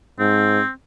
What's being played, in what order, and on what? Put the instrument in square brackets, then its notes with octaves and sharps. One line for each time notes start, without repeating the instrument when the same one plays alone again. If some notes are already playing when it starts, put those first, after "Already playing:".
[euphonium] G#2 [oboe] C4